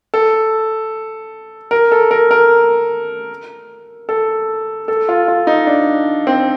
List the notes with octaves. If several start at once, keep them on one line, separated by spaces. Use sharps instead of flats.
A4
A#4
A4
A#4
A#4
A4
A4
F4
F4
D#4
D4
C4